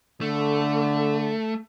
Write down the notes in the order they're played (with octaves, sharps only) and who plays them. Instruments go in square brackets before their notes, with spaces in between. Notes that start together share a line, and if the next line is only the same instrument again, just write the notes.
[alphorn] D3 [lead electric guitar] A3